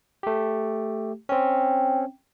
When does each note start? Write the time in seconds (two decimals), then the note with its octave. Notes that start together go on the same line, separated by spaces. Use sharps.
0.23 A3 G4
1.29 C4 C#4 G5